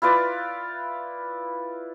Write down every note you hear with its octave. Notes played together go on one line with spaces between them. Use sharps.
E4 F4 B4 D5